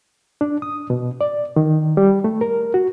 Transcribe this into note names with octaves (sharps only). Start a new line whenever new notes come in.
D4
D#6
B2
D5
D#3
G3
A3
A#4
F#4